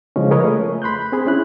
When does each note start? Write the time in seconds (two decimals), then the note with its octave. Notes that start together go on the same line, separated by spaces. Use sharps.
0.16 C#3 F3 G#3 C#4
0.31 F4 G#4 A#4 B4 C#5 D#5
0.44 A3
0.82 B5 C6 F#6 G6
1.12 C4 G#4 B5
1.27 C#4 E4 F#6